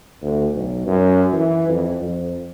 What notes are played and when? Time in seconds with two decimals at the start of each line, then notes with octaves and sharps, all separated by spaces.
0.22 D2
0.54 B1
0.86 F#2
1.33 E3
1.69 F2
2.02 F2